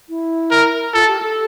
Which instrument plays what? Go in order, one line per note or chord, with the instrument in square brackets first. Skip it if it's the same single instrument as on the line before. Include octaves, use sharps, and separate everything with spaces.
[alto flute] E4
[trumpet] A#4
[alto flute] F4 [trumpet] A4
[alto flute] G4
A4